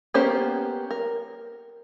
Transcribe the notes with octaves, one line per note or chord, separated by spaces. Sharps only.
A#3 B3 C#4 G4 C5
A#4